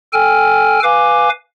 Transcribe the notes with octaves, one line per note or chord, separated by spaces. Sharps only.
A4 G5 G#5 F6
B4 F5 G#5 D6